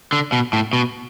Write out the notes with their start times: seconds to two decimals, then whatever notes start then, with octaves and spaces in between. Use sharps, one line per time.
0.13 D3
0.32 B2
0.53 A2
0.73 B2